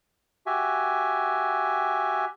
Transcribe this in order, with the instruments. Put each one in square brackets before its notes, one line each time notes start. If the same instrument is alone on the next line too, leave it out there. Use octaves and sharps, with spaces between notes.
[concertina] F#4 G4 E5 G#5